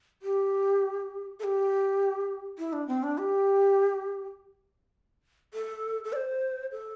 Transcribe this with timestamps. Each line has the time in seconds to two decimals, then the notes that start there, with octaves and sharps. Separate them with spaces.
0.22 G4
1.40 A4
1.44 G4
2.58 E4
2.73 D4
2.88 C4
3.03 D4
3.18 G4
5.54 A4
6.04 A4
6.13 D5
6.16 C5
6.72 A4